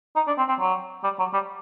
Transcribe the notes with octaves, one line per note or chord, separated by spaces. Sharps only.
D#4
D4
C4
C4
F#3
G3
F#3
G3